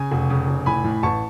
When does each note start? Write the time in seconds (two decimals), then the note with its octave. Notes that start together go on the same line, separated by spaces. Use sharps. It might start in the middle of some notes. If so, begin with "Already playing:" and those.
Already playing: C#3 G#5
0.11 F1
0.30 C#3
0.48 F1
0.66 A2 G#5 B5
0.84 A2
1.03 A1 A5 C#6